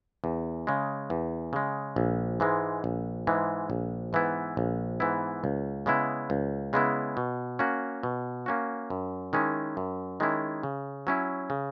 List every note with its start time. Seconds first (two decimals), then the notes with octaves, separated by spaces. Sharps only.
0.24 E2
0.67 C#3 G#3
1.10 E2
1.53 C#3 G#3
1.96 A#1
2.40 G#2 E3 G#3
2.84 A#1
3.27 G#2 E3 G#3
3.70 A#1
4.13 G#2 E3 B3 E4
4.57 A#1
5.00 G#2 E3 B3 E4
5.44 C#2
5.86 C#3 G#3 B3 E4
6.30 C#2
6.73 C#3 G#3 B3 E4
7.17 B2
7.59 A#3 C#4 F#4
8.03 B2
8.46 A#3 C#4 F#4
8.90 F#2
9.33 D#3 G#3 C#4 E4
9.77 F#2
10.20 D#3 G#3 C#4 E4
10.63 C#3
11.07 F#3 C#4 E4
11.50 C#3